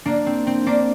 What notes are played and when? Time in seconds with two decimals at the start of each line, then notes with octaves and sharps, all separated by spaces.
0.05 A#3 D4
0.26 C4
0.47 C4
0.66 A#3 D4